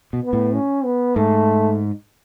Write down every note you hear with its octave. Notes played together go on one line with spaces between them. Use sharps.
B2
B3
A2
C#4
B3
G#2 A3